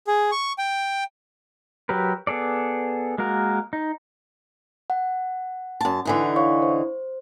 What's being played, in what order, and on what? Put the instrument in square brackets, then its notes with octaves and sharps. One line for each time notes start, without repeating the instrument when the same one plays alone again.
[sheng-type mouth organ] G#4
C#6
G5
[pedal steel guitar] F#3 G4 A#4 B4
B3 G#4 A4 D5
G#3 A#3 F#4 A#4
D#4
[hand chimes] F#5
[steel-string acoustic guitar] F#2 A5
D3 E3 D#4
[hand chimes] C#5 F5 C#6
C5